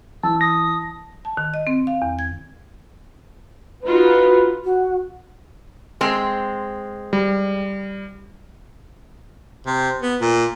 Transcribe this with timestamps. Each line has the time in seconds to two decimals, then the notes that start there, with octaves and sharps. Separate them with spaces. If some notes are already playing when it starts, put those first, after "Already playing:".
0.23 E3 A5 E6
0.41 D#6 A#6
1.25 A5
1.37 D#3
1.54 D#5
1.67 C4
1.87 F5
2.02 E2
2.19 G#6
3.84 D#4 F4 F#4 B4
4.64 F#4
6.01 G#3 C4
7.13 G3
9.66 C3
10.02 B3
10.21 A#2